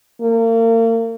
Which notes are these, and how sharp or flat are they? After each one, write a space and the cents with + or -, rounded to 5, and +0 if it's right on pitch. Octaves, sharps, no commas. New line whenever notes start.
A#3 -40